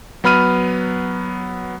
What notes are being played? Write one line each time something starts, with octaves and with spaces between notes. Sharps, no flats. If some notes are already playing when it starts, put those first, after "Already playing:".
F#3 B3 B5 F6 D#7